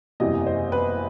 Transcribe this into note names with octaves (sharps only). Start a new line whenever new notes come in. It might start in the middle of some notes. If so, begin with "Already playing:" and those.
F#1 E2 C3 E3 G3 D#5
C5
B4